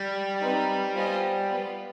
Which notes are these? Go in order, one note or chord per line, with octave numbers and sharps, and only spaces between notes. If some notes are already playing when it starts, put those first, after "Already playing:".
Already playing: G3
C4 D#4 B4
B3 F4 C5 D#5 G#5
B3 F4 B4